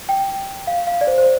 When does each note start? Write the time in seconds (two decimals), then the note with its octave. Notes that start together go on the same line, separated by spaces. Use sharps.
0.09 G5
0.67 F5
0.87 F5
1.01 D5
1.07 C5
1.18 C5